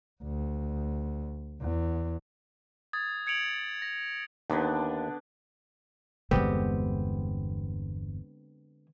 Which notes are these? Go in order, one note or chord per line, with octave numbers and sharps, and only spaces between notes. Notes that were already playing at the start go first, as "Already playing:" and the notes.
D2
E2
D#6 G#6 A6
G#6 C#7 D7 F7 F#7
A#6
D#2 D3 B3 D4
G1 E2 D3 G#3 B3 C4 G4